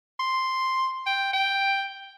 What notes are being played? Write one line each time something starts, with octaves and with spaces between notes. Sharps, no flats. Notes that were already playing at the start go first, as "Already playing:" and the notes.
C6
G5
G5